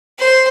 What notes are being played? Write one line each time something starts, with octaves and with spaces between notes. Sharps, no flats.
C5